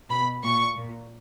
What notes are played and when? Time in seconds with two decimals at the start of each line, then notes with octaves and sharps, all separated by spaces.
0.09 B2 B5
0.44 A#2 C#6
0.77 A#2